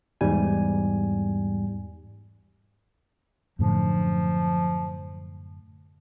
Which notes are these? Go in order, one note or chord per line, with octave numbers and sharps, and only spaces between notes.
E2 G#2 G3 G#5
F#2 A2 D3 F3